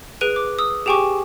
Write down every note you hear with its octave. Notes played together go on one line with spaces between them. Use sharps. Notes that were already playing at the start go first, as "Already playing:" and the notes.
G#4 B4 F#6 D7 D#7
D6
D#6 E6
G4 G#4 G5 G#5 C#6 D6